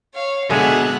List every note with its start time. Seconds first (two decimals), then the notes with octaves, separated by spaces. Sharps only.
0.14 C#5 F5
0.50 B2 D3 G#3 D4 E5 F#5 G#5 F#6